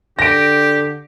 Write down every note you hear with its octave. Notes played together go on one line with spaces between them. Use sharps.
D3 G4 A#6 D7